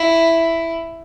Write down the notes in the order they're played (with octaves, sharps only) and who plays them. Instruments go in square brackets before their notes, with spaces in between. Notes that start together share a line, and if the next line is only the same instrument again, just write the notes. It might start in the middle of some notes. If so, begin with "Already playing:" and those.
Already playing: [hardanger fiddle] E4